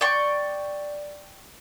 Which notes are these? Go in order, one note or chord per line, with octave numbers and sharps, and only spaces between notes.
D5 G5 C#6